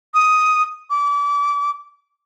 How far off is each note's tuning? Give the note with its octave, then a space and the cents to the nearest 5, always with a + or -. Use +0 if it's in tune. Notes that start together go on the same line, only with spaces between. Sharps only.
D#6 +5
D6 -30